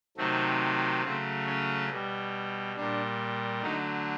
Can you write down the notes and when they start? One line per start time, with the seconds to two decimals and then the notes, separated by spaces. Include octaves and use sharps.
0.17 C3 D#3 F#3 A3 C4
1.03 C#3 F#3 A3 C4
1.46 C#4
1.90 B2 G3
2.76 A#2 G3 D4
3.62 D3 F#3 A3 D#4